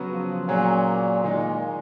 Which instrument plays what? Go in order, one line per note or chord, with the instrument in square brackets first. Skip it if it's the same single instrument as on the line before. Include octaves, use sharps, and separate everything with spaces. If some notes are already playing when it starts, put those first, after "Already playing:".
Already playing: [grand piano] C#3 F#3 B3 F#4 B4
[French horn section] F3
[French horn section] A#2 [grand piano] F#3 C#4 G#4 C#5
[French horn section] A#2 [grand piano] D#3 G#3 D#4